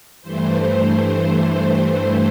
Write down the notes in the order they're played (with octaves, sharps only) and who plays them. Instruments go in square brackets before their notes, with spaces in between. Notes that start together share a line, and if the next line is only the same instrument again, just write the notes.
[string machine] G2 E3 A3 C5